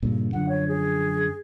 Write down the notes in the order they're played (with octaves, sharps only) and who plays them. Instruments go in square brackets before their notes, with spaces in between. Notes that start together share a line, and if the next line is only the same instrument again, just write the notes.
[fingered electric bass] G2 A#2 C#3
[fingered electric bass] F#2 D3 F3 [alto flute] F#5
[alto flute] C#5
G#4